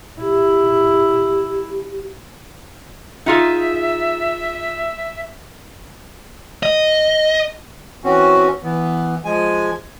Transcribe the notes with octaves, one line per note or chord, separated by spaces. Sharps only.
E4 G4
D#4 F4 G#4 E5
D#5
E3 C4 C#4 F#4
E3 B3
F3 G#3 G#5